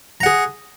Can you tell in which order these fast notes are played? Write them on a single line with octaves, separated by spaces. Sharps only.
A#5 F#5 G#4